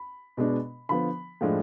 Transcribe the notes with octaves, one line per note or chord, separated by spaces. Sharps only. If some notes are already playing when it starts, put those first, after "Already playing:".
Already playing: B5
B2 G#3 B3 D4
D3 F3 B3 B5
A2 F3 G#3 D4